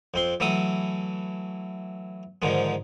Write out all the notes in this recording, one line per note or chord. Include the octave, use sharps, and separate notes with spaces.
F2 C4 C6
E3 F#3 A3 A4 D#6
G#2 D3 D#3 F3 G#3